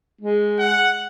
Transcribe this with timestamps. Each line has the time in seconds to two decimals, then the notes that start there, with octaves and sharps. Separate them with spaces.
0.21 G#3
0.59 F#5